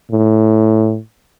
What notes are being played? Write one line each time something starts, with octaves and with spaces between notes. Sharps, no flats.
A2